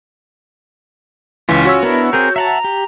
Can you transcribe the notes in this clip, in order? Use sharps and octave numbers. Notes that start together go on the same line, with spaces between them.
C#2 E3 C#4 F4 B6
F#4 C#5 E6
B3 D4 E4 A#4
C4 G#4 A#4 G6
E5 F#5 A5 A#5
G4